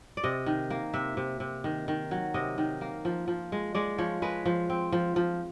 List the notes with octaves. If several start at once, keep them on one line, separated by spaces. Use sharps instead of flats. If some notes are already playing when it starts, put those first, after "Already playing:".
D5
C3 D#5
D#3
A#3
C3 E5
C3
C3
D#3
D#3
F#3
C3 D#5
D#3
A#3
F3
F3
G#3
G#3 D5
F3 C#5
G#3 B4
F3
C4
F3
F3